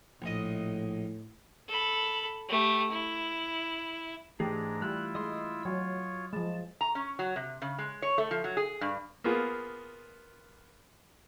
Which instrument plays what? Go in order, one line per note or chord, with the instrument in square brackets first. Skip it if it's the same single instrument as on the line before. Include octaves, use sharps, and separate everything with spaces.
[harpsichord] A#1 D#5 [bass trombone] A2
[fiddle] A4 B5
A3 G4
E4
[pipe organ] G#2 D4 A#5 [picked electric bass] E3 A3 [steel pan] G4 [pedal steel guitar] G#4
[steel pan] G3 [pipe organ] E4 F4 E6 [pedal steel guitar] F#6
[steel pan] G#3 [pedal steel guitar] D#5 C6
[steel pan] F#3 [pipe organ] F4 C#5
[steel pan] F3 G#3 [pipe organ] A5
[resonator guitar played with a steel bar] A#5
C#4
F#3
C3
C#3
G#3
C#5
A3
F3
F#3
G#4
G2
[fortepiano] A#3 B3 F4 G#4